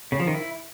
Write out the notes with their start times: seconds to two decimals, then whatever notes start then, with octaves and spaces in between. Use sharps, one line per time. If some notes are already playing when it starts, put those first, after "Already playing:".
0.12 C#3
0.20 F3
0.27 D#3
0.34 E4